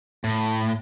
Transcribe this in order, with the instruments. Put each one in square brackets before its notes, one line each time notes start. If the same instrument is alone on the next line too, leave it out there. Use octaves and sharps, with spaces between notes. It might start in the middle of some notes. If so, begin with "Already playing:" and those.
[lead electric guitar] A2